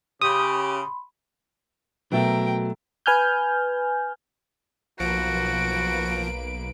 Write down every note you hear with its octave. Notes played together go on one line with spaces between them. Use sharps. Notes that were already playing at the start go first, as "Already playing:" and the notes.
C#3 G4 B5 C6 D#6
B2 F#3 A3 A#4 E5 G5
B4 G#5 F6 G6
B1 F3 A#3 F#4 B4 D7